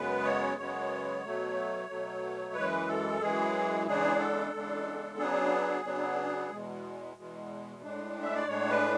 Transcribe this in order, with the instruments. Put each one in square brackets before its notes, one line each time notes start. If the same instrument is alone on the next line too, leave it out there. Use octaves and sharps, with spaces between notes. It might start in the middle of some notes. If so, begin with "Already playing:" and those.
Already playing: [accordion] F#2 C#3 G#3 B3 B4
C#5
F#2 C#3 G#3 B3 C#5
B2 F#3 A3
B2 F#3 A3
F#2 E3 G#3 B4
A4
F#2 E3 G#3 G#4
E2 C#3 G#3 D4 G#4
A4
E2 C#3 G#3 D4
C#3 F#3 B3 D4 G#4
C#3 F#3 B3 D4
E2 B2 G#3
E2 B2 G#3
A2 G#3 D4
E5
D5
A2 G#3 D4 C#5
B4